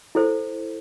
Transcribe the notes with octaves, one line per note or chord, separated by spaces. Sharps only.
E4 A4 C5